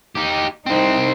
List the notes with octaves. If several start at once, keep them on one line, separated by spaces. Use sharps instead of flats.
D#4 G4
C2 C4 D#4 C5